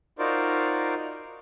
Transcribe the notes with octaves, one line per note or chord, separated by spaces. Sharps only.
D#4 F4 F#4 A#4 C5 D5